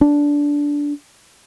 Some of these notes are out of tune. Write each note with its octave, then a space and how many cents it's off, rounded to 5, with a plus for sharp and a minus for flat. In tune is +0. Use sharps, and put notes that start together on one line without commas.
D4 -15